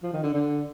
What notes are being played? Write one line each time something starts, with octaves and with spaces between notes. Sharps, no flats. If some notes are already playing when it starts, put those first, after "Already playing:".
F3
D#3
D3
D3